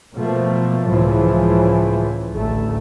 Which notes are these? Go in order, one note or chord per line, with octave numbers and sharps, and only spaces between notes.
B2 F3 A3 A#3
C#2 A2 C#3 E3 F3
A1 D2 A3